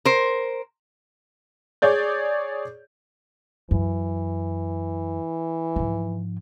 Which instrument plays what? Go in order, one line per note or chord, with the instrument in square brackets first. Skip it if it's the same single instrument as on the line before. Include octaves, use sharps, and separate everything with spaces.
[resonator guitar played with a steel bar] A#4 C5
[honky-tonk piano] G#4 C#5 D5 G6
[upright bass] F#2 [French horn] E3
[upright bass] G#2 F3